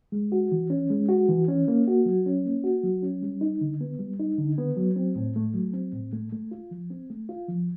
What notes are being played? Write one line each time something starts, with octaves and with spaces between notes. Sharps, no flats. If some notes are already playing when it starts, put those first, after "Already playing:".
G#3
F#4
E3
C#4
G#3
F#4
E3
C#4
A#3
F#4
F#3
C#4
A#3
F#4
F#3
C#4
G3
D#4
D3
B3
G3
D#4
D3
B3
F#3
C4
A2
A3
F#3
C4
A2
A3
A3
F4
F3
C4
A3
F4
F3